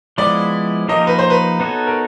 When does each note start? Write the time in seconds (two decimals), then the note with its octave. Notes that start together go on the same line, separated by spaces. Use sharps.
0.18 F3 G#3 B3 E4 D5
0.88 F3 A#3 D#4 G4 A#4 D#5
1.07 B4
1.19 C5
1.30 B4
1.60 B3 D#4 F#4 A4 C#5
1.87 A#4